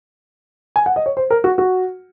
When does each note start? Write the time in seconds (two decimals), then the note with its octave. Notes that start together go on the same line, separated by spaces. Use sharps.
0.76 G#5
0.86 F#5
0.96 D#5
1.06 C#5
1.17 C5
1.30 A#4
1.44 F#4
1.58 F#4